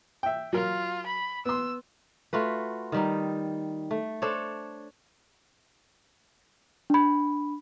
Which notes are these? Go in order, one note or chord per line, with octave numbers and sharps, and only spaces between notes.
E5 G5
F#3 F4 A#4
B5
B3 C6 E6
A3 F4 F#4 B4
D#3 G3 D#4
A3
D4 A4 C5 C#5
D4 B5